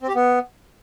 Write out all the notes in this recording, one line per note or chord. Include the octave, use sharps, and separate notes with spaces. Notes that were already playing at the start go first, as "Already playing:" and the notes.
C4
G4
B3